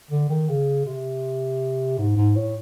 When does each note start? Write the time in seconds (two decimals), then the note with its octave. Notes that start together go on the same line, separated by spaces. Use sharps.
0.11 D3
0.30 D#3
0.49 C#3
0.86 C3
1.99 G#2
2.17 G#2
2.36 A2